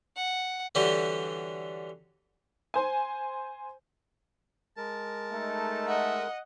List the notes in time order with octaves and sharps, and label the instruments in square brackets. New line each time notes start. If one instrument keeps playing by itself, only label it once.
[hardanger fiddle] F#5
[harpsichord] D3 E3 F#3 G3 G4
[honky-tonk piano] C5 G#5
[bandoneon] G#3 A#4 [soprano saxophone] A5
[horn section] A3 D#4 A4
[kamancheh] D#5 F#5 [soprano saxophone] E5